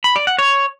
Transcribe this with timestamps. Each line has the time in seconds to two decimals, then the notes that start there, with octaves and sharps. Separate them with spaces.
0.04 B5
0.16 D5
0.27 F#5
0.39 C#5